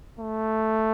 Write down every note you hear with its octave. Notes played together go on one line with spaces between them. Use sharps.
A3